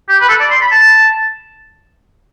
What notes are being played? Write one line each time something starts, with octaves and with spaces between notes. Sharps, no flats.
G4
B4
A4
D5
C6
B5
A5